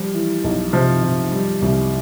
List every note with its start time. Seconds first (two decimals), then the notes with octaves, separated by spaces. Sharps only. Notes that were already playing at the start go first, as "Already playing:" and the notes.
Already playing: F3 G3
0.14 E3
0.44 B1
0.73 C3 F3
1.03 C3
1.32 G3
1.62 C2